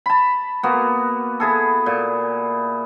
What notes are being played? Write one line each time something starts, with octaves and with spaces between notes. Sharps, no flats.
A5 B5
A#3 B3 F#4
E4 G#4 A4
A#2